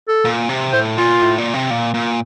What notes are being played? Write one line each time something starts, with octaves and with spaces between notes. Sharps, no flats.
A4
A#2
C3
A2 C5
A#2 F4
A2
A#2
C3
A#2
A#2